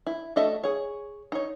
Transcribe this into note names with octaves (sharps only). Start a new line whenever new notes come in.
E4
A3 F#4 A4 D#5 E5
G#4 C#5
D#4 C#5